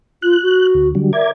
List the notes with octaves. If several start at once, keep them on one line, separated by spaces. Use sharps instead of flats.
F4 F#6
F#4
D2
D3 F#3 G3
A#4 D5 E5 G#6